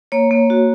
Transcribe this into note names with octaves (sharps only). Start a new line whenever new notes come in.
A#3 C#5
A#3
F#4